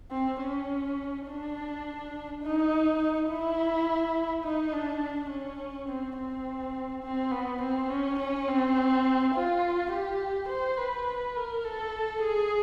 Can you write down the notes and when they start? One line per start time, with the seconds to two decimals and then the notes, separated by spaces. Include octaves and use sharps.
0.12 C4
0.41 C#4
1.27 D4
2.43 D#4
3.29 E4
4.44 D#4
4.73 D4
5.30 C#4
5.88 C4
6.18 C4
7.03 C4
7.32 B3
7.61 C4
7.90 C#4
8.19 C#4
8.48 C4
9.35 F4
9.92 G4
10.49 C5
10.78 B4
11.07 B4
11.36 A#4
11.65 A4
12.22 G#4